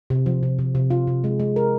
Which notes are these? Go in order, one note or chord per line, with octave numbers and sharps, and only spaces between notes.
C3
F3
C3
C3
C3
F4
C3
G#3
G#3
A#4